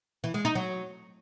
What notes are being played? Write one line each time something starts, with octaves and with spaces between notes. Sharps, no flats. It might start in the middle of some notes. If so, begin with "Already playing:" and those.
E3
G#3
D#4
F#3